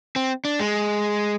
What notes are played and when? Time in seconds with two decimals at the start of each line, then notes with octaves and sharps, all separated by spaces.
0.16 C4
0.45 D4
0.60 G#3